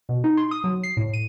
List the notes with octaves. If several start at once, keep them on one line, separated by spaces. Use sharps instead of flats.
B2
D#4
C6
D#6
F#3
C7
A2
D#7